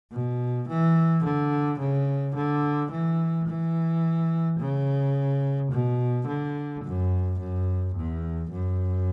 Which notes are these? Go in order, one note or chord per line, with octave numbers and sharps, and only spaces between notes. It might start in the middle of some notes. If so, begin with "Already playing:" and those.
B2
E3
D3
C#3
D3
E3
E3
C#3
B2
D3
F#2
F#2
E2
F#2